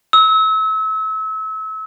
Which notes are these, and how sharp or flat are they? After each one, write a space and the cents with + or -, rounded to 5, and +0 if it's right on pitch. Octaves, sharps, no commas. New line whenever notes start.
E6 -30